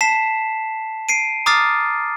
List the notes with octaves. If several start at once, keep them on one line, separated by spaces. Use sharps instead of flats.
A5 B6 C7 E7
C7 D7 D#7
A#5 D6 D#6 F6 A6 C7